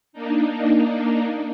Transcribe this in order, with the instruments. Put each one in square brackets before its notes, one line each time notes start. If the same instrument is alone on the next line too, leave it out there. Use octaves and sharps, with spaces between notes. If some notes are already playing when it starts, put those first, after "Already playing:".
[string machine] A#3 D4 D#4